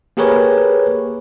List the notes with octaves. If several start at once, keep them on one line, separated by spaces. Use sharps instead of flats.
A#3 G4 G#4 A#4 B4 C#5